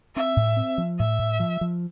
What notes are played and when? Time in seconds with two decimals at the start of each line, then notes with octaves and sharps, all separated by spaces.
0.15 C4 E5
0.37 A2
0.57 C4
0.78 F3
0.99 A2 E5
1.19 A2
1.40 F3
1.61 F3